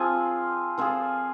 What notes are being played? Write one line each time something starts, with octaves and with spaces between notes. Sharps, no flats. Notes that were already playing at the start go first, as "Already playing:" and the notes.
Already playing: F3 C4 F4 G#4
F3 C4 F4 G#4